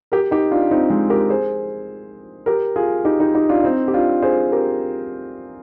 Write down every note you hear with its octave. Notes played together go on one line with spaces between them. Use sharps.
G4 A#4
D#4 G4
D4 F4
C4 D#4
G#3 C4
G4 A#4
G#4 C5
G4 A#4
F4 G#4
D#4 G4
D#4 G4
D#4 G4
D4 F4
C4 D#4
G4
D4 F4
G#4 C5
G4 A#4